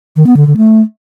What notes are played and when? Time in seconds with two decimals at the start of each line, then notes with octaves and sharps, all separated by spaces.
0.16 D#3
0.27 B3
0.37 D3
0.47 D3
0.57 A3